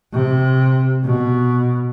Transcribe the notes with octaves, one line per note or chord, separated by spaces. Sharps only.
C3
B2